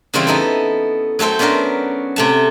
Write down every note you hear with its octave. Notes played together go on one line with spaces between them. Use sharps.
C#3 E3 G3 C4 E4 F4
B3 D#4 E4 A4
F#3 A3 A4 C5 G5
B3 C#4 D4 F#4 A#4
C3 A3 A5